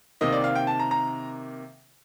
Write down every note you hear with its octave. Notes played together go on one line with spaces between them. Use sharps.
C3 D#3 A#3 D#5
D5
F5
G5
A5
A#5
A#5